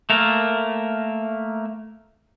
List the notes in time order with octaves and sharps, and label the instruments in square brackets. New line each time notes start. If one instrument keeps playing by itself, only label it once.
[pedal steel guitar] A3 A#3 A#4